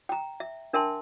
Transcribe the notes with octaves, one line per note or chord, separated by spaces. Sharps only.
G5 A#5
E5
D4 A#4 E5 G5 A5 C6